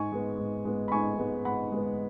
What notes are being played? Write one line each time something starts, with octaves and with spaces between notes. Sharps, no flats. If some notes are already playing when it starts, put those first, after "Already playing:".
Already playing: G#2 G#5 C#6
G#3 B3
G#2
G#3 B3
B5
G#2 G#5 C#6
G#3 B3
G#2 F#5 B5
G#3 B3